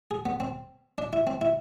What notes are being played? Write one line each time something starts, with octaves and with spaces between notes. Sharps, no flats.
G#4
B3
C4
D4
E4
C4
E4